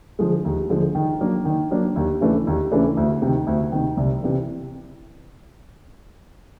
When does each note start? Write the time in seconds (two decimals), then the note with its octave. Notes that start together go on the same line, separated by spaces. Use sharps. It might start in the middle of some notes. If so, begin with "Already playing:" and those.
0.19 D3 F3 G#3
0.44 D#2
0.70 D3 F3 G#3
0.95 D#3
1.20 F#3 A#3 D4
1.45 D#3
1.71 F#3 A#3 D4
1.96 D#2
2.21 C#3 E3 A3 D4
2.47 D#2
2.72 C#3 E3 A3 D4
2.97 D2
3.22 C3 D#3
3.47 D2
3.72 C3 D#3
3.97 C2
4.23 C3 E3